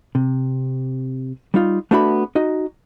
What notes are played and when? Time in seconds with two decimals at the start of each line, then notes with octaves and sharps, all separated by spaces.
0.15 C3
1.54 G3 D#4 F4
1.91 A3 B3 D4 F#4 E5 B5
2.35 D#4 F#4 D#5